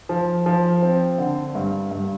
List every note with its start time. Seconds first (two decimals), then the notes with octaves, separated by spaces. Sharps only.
0.09 F3
0.46 F3
0.82 C4
1.18 D3
1.55 G2
1.91 G2